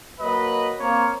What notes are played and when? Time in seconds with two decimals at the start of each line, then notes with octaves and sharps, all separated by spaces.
0.21 F#3 A#3 B4 D#5
0.80 A#3 C4 F4 C#5